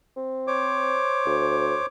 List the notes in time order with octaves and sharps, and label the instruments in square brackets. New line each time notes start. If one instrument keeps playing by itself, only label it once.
[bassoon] C4
[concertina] C5 C#5 D6
[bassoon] D2